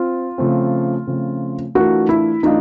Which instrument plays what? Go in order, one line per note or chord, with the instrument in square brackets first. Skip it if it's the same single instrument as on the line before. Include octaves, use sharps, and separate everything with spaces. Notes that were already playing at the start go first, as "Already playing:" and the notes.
Already playing: [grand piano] C4 [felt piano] F4
[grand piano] C#3 F3 A3 C4
C#3 F3 A3 C4
[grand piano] E3 A3 D4 F4 A#4 [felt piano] F#4
[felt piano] E4
[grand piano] E3 A3 D4 F4 [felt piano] D#4